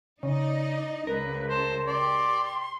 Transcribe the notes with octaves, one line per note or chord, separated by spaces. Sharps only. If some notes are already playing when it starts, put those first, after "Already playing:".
C#3 D#4 D5 D#5
C#2 A#4 B4
C5 A5
G4 D5 C6